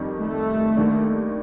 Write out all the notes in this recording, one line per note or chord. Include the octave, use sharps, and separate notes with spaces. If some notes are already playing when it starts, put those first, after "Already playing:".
Already playing: F2 D#3 G3
A3
D#2 D#3 G3 D4